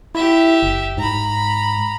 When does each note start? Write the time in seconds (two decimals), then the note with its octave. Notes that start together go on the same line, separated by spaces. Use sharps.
0.15 E4 G4 E5
0.63 F#1
0.98 G#2 A#5 B5